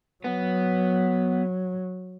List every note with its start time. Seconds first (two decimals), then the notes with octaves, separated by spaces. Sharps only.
0.24 F#3 B3